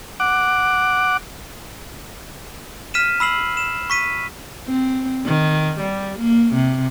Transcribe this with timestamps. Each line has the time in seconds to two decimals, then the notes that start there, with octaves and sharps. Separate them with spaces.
0.20 F#5 D6
2.94 F6 B6 D#7 E7
3.20 B5 E6 C7 F#7
3.57 E7
3.90 C#6 B6 D#7
4.67 C4
5.26 D#3
5.80 G3
6.20 A#3
6.55 C3